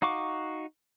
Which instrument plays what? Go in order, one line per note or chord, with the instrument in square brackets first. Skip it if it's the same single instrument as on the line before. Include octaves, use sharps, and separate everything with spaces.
[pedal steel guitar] D#4 F#4 F5 C#6 D6